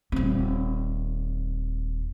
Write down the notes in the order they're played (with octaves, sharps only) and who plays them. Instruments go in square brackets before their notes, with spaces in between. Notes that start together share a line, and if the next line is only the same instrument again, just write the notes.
[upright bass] D#1 C4